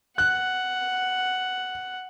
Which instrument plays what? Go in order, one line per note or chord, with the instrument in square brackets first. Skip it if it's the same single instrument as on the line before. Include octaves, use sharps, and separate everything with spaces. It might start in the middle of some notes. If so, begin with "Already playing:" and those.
[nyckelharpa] F#5 [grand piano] F#6